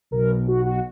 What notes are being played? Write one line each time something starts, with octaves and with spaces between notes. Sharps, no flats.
B1 B2 A#4
F#4
F#4